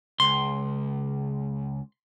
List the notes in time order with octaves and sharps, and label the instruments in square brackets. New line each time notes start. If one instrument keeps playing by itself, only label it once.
[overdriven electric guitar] C#2 [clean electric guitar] C6